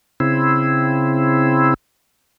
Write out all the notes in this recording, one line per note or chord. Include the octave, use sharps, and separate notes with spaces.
C#3 C4 E4